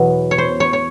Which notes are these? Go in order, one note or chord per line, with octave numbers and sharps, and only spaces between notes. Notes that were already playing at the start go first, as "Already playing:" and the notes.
Already playing: E2 B2 F#3
C#5
C5
C#5
C#5